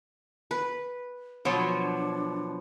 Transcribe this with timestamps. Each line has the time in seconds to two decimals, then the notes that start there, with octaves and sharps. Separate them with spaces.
0.51 B4
1.45 B2 F3 F#3 D4 C#5